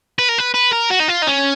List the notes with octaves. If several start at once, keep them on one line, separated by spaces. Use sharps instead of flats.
B4
A#4
B4
B4
A#4
F#4
D#4
F4
D#4
C#4